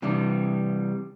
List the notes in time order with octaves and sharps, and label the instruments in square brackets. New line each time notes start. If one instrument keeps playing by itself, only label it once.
[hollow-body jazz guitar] C3 E3 G3 D4